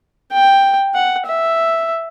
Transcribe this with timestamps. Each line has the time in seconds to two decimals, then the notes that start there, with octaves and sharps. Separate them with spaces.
0.32 G5
0.95 F#5
1.26 E5